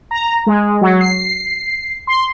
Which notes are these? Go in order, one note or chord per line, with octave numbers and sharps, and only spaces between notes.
A#5
G#3
F#3
C7
C6